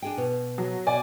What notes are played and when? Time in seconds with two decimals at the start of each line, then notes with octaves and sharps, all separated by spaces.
0.02 D4 G#4 G5
0.17 B2
0.58 F#3
0.87 B2 D5 G#5